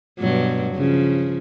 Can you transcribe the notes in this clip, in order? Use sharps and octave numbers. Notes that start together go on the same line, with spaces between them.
G2 B2 F#3
C#3 F3